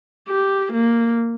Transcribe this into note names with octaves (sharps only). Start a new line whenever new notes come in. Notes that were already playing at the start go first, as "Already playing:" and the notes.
G4
A#3